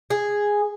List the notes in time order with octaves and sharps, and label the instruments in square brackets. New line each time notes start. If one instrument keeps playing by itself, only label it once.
[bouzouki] G#4